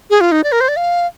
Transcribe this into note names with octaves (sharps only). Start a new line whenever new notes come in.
G#4
F4
D#4
D5
A#4
C5
D5
F5